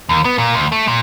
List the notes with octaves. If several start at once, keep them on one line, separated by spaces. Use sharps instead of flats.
D#2
B3
A#2
D2
A3
A#2